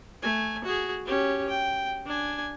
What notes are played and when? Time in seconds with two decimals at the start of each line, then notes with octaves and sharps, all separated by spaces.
0.22 A3 G#5
0.64 F#4 G#4
1.06 C#4 G4
1.49 G5
2.06 D4 G#5